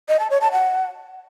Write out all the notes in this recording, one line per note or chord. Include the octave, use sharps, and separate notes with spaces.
D#5
A5
C#5
A5
F#5